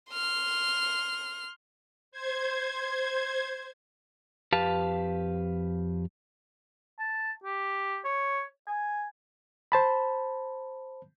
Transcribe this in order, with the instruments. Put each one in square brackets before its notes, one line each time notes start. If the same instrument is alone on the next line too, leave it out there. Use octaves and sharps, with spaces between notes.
[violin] C6 F6
[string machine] C5 G#6
[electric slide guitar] F2 G4 B4 F5 A5
[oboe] A5
G4
C#5
G#5
[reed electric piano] C5 A5 B5